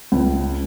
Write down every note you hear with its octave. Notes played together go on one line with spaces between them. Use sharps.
C#2